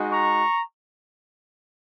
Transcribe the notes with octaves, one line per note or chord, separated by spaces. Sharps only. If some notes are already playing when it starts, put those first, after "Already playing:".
Already playing: G#3 D#4 F#4
A#5 C#6